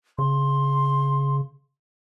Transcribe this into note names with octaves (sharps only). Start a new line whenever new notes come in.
C#3 C6